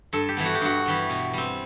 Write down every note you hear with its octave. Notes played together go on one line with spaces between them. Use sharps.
G2 A4
G4
E3 G3 B3
F#4
G4
G2 F#4
E3 G3 B3
B2
G3 C4